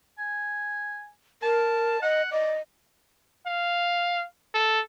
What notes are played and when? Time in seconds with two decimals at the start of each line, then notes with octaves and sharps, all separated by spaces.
0.18 G#5
1.43 A#4 A5
2.02 D#5 F#5
2.32 D5 D#5
3.47 F5
4.54 A4